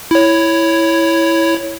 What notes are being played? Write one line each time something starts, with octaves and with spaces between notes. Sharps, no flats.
E4 C#5